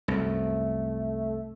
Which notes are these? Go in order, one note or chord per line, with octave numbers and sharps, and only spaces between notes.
C2 F#2 A3